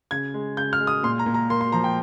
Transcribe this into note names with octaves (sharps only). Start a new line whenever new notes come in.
C#3 G#6
G#3
C#3 G6
F6
G#3
D#6
A#2 C6
A#5
A#2
A#5
A#3 C6
C6
F3 A#5
G5